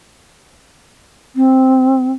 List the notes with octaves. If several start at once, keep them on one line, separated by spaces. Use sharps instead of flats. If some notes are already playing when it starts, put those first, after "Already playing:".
C4